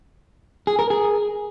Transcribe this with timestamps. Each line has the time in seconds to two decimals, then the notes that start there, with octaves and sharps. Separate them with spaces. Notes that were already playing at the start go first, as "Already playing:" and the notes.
0.67 G#4
0.79 A#4
0.90 G#4